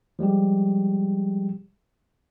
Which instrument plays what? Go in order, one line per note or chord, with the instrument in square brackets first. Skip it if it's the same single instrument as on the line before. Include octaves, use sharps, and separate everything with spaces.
[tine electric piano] F3 G3 G#3 G4